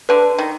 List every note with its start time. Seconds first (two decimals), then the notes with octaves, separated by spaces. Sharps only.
0.09 D3 B4
0.38 D#3